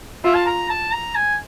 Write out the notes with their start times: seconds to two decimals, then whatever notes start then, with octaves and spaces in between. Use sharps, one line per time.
0.24 F4 E5
0.35 A5
0.46 A#5
0.69 A5
0.93 A#5
1.16 G#5